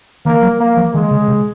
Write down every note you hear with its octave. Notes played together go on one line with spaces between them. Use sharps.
D#3 A#3
F#3
A#3
F3
D#3 G#3
C#3
C3